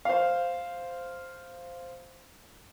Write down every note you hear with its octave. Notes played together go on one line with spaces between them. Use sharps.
C5 F5